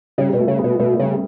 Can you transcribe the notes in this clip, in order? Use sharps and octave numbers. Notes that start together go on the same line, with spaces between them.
C#3 G3
B2
A3
C#3
B3
B2
B2 A3
C#3 G3